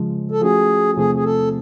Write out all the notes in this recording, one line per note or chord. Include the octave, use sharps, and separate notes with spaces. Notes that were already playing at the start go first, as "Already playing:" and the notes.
Already playing: C#3 F3 G#3
A4
F3 A3 C#4 F#4 G#4
E2 C3 F3 A3 C4 G#4
G#4
A4